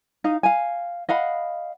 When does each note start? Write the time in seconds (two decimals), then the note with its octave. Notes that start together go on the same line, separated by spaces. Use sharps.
0.24 D#4 F5
0.43 F5 G#5
1.09 D#5 F5 F#5 B5